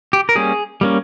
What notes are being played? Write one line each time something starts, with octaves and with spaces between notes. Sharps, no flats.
G4
A#4
G3 A#3 C#4 G#4
G3 A#3 C#4